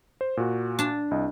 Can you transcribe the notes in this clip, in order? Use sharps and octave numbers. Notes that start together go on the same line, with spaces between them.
C5
A#2 F#4
D4 A5
C2 D#5